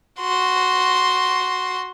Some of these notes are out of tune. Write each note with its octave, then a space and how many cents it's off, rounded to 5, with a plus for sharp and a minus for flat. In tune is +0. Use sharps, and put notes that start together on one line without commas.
F#4 +0 C6 +0